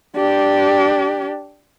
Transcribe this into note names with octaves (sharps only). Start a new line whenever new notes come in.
D4 G4